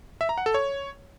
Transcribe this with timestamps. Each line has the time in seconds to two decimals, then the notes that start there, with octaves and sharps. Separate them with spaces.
0.21 E5
0.29 A#5
0.38 F#5
0.46 A4
0.54 C#5